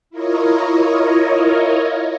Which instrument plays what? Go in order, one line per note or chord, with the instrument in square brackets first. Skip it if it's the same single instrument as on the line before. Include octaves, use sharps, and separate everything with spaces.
[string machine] E4 F4 A#4 C#5 D#5